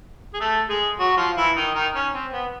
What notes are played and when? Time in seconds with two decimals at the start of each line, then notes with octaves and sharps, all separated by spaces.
0.34 G#4
0.40 A3 A4
0.69 G#3 G#4
0.99 F#3 F#4
1.17 F3 F4
1.37 E3 E4
1.56 D#3 D#4
1.75 D#3 D#4
1.95 C#4
2.14 C4
2.33 B3